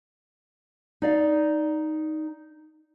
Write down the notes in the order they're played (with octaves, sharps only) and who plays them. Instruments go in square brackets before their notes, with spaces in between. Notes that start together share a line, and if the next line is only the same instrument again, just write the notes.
[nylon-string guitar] D#4 D5 F5